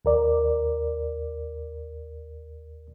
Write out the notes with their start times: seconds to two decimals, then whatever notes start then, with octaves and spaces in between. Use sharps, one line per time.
0.05 D#2 A#4 D5